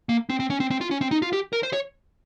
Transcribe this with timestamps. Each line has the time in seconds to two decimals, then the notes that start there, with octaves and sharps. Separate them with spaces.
0.09 A#3
0.30 C4
0.40 C4
0.50 C#4
0.60 C4
0.71 C4
0.81 F4
0.91 C#4
1.01 C4
1.11 D#4
1.22 F4
1.33 G4
1.53 A#4
1.63 C5
1.73 C#5